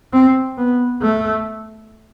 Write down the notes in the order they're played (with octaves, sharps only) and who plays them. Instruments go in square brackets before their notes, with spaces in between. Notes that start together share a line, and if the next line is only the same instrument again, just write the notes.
[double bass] C4
B3
A3